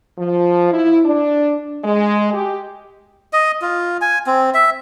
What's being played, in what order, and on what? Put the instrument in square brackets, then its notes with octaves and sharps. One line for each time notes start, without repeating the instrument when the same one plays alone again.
[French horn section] F3
E4
D4
G#3
G4
[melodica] D#5
F4
G#5
C4
E5